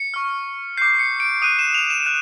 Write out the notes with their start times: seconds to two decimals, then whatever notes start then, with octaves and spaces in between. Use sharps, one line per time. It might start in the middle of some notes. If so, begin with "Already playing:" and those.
Already playing: C#7
0.14 C#6 F6
0.77 D6 G6 C7
0.99 C#7
1.20 D7
1.42 D#6 F#6 D#7
1.59 E7
1.74 F7
1.90 E7
2.06 F#6